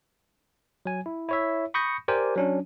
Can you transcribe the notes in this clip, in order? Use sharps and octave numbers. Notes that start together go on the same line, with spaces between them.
F#3 G#5
E4
E4 C#5 E5
B5 C#6 D#6 G6 A#6 C#7
G4 A#4 C5 D5 G5 G#5
F#3 C#4 D4